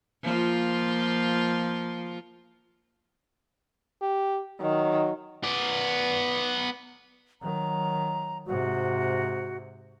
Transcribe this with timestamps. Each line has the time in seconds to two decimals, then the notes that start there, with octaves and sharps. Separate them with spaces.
0.23 F3 A#3 F4
4.02 G4
4.61 D#3 F#3
5.43 B3 D5
7.42 D#3 F#3 A#5
8.46 G#2 C3 F#4